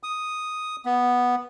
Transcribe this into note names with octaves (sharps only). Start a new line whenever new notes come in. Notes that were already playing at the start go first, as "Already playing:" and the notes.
D#6
B3